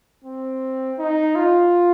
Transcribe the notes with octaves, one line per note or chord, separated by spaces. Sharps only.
C4
D#4
F4